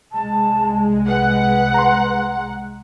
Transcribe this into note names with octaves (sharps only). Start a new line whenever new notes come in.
C2 G#3 A5
B4 F#5
A#5 C6